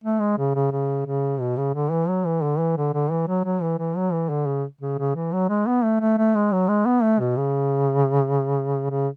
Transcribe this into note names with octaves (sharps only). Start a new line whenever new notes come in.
A3
G#3
C#3
C#3
C#3
C#3
B2
C#3
D3
E3
F#3
E3
D3
E3
D3
D3
E3
F#3
F#3
E3
E3
F#3
E3
D3
C#3
C#3
C#3
E3
F#3
G#3
B3
A3
A3
A3
G#3
F#3
G#3
B3
A3
B2
C#3
C#3